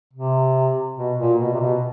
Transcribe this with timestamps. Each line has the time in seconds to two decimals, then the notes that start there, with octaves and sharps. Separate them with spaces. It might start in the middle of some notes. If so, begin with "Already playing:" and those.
0.13 C3
0.97 B2
1.18 A#2
1.39 B2
1.54 C3
1.60 B2